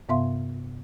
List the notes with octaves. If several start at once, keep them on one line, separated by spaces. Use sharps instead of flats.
G2 C3 B3 E5 F5 C6